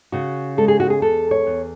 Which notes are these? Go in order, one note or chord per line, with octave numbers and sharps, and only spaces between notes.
C#3 F#4
G#3 A4
G#4
F#4
G#4
E2 A4
C#5
E2